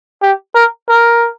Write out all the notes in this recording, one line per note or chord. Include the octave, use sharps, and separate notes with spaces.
G4
A#4
A#4